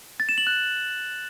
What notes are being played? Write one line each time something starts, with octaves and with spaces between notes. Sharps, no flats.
A6
E7
F#7
F#6